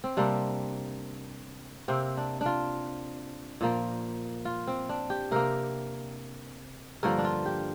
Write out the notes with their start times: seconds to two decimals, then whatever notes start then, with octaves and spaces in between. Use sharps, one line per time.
0.04 C4
0.17 C3 G3 A#3 D4
1.88 C3 A#3 C4
2.17 D4
2.41 D4
2.46 F4
3.61 A#2 F3 A#3
4.45 F4
4.67 C4
4.89 D4
5.10 G4
5.31 C3 A#3 A#4
7.03 G2 D3 F3 A#3 A#4
7.18 D4
7.25 F4
7.46 G4